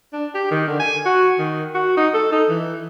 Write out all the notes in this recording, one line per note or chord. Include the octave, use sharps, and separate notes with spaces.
D4
G4
D#3
D3
G#5
F#4
D#3
F#4
D#4
A4
D#4
E3